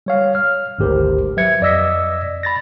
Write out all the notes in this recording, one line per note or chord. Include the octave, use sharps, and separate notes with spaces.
G3 C#5 F5
F6
G#1 D2 G4 A#4 C5
F#3 B4 E5 G#6 C#7
F2 D5 D#5 E6 A#6 B6
B5 A6 A#6